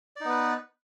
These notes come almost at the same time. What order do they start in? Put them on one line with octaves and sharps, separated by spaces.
D5 D#4 B3 B4